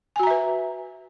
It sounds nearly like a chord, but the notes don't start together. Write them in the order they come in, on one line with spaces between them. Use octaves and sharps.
G#5 F#4 A#5 E5 B4